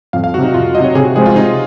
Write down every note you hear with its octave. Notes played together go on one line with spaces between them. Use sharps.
F2 F5
F5
C3 F#3 F#4
D#4
F2 F4
C3 F#3 D#5
C#5
C3 G#4
F#4
F3 G#3 C4 G#4
F4
C3 D#4